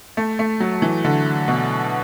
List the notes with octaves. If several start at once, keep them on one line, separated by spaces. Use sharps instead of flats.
A3
A3
F#3
E3
D3
B2